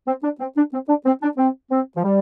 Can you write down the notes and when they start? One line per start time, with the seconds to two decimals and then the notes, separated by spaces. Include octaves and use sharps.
0.08 C4
0.23 D4
0.40 C4
0.57 D4
0.73 C4
0.89 D4
1.06 C4
1.22 D4
1.38 C4
1.71 C4
1.97 F3
2.04 G3